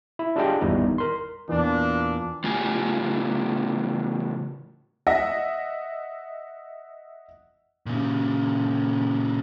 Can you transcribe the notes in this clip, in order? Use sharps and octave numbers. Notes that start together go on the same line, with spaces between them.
E4
D4 F4 G4 G#4 D#5 G5
G#1 E2 G3 B3 D#4 E4
A#4 C6
E2 A#2 E3 D4
A2 C#3 F4 G4 G#5
D#5 E5 F#5 A#6
A#2 C#3